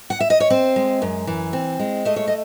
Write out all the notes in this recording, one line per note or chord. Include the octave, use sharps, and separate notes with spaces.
F#5
E5
D#5
C#5
C4 C5
G#3
F#2
E3
C4
G#3
A3 D#5
C#5
D#5